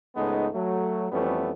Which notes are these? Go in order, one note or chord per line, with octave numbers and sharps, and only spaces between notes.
C#2 G#2 G#3 A3 B3 D#4
F#3 A3
F2 E3 G3 A3 B3 C#4